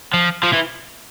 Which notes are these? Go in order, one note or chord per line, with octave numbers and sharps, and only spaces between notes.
F3
F3
E3